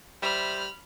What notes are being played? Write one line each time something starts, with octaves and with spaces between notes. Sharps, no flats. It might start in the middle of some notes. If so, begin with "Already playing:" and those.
G3 C5 E5 B5 F6